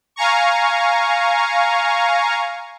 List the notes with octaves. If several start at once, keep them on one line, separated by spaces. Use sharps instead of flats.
F5 G#5 A#5 C#6